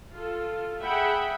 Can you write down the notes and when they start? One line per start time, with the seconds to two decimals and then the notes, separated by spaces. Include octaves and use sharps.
0.11 F4 A4
0.81 G#4 E5 F#5 G5 B5